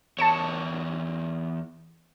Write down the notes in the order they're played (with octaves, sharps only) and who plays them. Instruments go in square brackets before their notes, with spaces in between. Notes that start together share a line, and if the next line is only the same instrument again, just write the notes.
[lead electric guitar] E2 C#5 [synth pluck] A5 C#7 E7